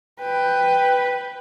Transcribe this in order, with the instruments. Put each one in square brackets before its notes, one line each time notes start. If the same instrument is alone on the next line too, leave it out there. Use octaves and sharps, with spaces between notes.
[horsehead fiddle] B4 G5